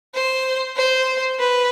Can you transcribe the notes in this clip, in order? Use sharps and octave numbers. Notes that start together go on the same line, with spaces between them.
C5
C5
B4